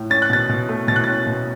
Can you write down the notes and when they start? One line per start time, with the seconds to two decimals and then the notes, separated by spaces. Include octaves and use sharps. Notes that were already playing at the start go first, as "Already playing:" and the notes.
Already playing: A2
0.10 C#4 A6
0.22 F#6
0.30 B2 A6
0.49 B2
0.69 A3
0.88 B2 A6
0.96 F#6
1.04 C#4 A6
1.27 B2